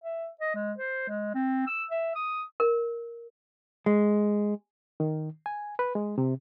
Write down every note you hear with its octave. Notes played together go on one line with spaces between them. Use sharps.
E5
D#5
G#3
C5
G#3
C4
E6
E5
D#6
A#4
G#3
D#3
G#5
B4
G#3
C3